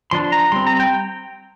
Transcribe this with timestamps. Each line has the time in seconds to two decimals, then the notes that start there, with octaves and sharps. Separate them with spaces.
0.11 F3 D4 C6
0.32 A#5
0.52 G3 C4 C6
0.67 A#5
0.80 G5